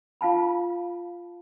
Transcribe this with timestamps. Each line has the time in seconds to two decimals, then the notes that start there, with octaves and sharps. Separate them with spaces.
0.21 F4 F5 A5 B5